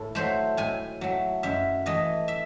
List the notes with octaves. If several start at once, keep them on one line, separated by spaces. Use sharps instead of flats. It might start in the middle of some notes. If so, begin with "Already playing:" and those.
Already playing: A2 A4
F#3 A3 C5
A2 G#5
F#3 A3
F#2 E5
E3 A3 D#5
E5